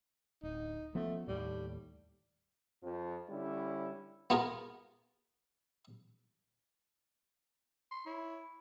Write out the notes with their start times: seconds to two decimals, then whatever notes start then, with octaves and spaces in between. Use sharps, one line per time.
0.43 D1 D#4
0.95 F3 A3 B3 C#4
1.28 D#2 A2 G3
2.82 F2 F3
3.29 D3 G3 C#4 E4
4.30 B3 F4 G#4 A#4
7.91 C6
8.06 E4 C#5